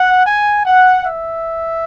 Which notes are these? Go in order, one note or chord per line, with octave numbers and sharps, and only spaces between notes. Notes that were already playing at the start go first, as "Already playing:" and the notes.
Already playing: F#5
G#5
F#5
E5